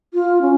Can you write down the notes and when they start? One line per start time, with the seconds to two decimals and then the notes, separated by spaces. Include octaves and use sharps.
0.14 F4
0.41 C#4